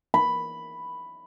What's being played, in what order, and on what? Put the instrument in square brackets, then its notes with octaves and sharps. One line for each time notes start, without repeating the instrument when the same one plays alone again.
[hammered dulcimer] B5